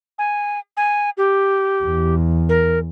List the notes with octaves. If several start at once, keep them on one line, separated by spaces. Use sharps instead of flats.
G#5
G#5
G4
E2
A#4